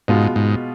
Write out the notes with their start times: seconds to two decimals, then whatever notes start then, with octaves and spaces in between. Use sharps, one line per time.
0.08 G#2 B2 G#3 B3 F4
0.36 G#2